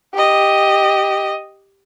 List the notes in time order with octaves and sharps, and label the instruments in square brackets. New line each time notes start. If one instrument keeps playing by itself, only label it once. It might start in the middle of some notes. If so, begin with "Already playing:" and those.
[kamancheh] G4 D#5